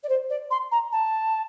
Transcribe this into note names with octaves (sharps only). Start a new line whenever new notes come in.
D5
C5
D5
C6
A#5
A5